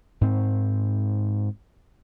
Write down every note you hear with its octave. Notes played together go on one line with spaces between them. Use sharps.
G#2 C4